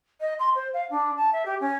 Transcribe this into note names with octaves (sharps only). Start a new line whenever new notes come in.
D#5
C6
C5
F5
D4
A5
E5
G4
C#4